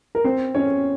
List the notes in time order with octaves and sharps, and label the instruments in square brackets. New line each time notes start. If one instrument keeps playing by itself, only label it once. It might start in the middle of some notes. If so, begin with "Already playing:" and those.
[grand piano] A#4
C4 C5
C#4 C#5